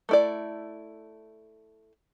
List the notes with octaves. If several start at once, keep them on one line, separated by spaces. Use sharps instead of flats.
A3 E4 D5